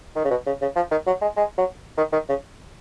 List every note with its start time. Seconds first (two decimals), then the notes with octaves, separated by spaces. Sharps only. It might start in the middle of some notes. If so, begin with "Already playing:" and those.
0.16 D#3
0.25 C#3
0.30 B2
0.46 C#3
0.61 C#3
0.76 F3
0.91 D#3
1.06 F#3
1.22 G#3
1.37 G#3
1.58 F#3
1.97 D#3
2.12 D#3
2.29 C#3